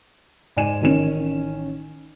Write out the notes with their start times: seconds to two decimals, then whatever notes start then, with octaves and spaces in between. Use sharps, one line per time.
0.57 G#2 D5 G#5 D#7 E7
0.81 A1 D#3 C#4 E7